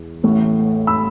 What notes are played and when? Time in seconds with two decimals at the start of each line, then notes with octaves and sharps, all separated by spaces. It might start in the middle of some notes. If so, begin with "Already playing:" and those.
Already playing: E2 E3
0.24 A1 A2 A3
0.87 B5 E6